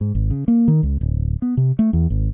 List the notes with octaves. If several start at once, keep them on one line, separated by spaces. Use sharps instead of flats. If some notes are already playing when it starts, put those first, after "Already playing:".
G#2
G#1
C#3
A#3
D#3
C#2
D1
B3
C3
A3
E2
G#1